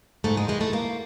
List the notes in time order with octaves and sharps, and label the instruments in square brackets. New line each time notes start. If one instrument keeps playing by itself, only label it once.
[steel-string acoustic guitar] G#2 A3
G#3
E3 G#3
A3
G#2 A#3